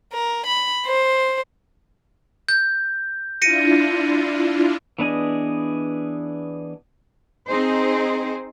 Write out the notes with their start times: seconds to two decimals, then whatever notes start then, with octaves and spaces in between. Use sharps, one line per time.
0.13 A#4
0.47 B5
0.86 C5
2.49 G6
3.42 D4 E4 F4 A#6 C#7 D#7
4.99 E3 B3 D4 G#4 D#5
7.47 C4 D#4 G#4 C5